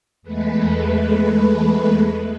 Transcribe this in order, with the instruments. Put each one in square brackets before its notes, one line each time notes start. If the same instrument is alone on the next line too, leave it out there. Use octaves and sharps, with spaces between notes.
[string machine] E2 G#3 A3 B4